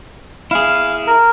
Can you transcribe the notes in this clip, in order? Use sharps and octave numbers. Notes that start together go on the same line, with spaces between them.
E4 G#4 F5
A#4